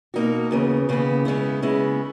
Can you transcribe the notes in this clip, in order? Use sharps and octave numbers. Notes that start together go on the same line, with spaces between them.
B2 A#3 D#4 F#4
D#2 C#3 E3 B3
D#2 C#3 E3 B3
C#3 G#3 B3 E4
C#3 G#3 B3 E4